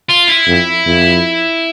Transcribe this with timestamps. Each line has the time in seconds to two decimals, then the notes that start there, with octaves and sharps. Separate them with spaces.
0.10 F4
0.29 E4
0.47 F2
0.86 F2